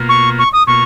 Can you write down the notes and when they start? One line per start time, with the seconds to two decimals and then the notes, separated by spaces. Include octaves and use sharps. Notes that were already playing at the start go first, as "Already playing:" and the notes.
Already playing: B2 A#3 F4
0.09 C#6
0.38 C#6
0.53 D#6
0.67 B2 A#3 F4 C#6